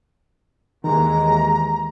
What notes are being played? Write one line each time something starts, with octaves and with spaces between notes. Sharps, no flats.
D#2 D#3 E3 G#3 A#5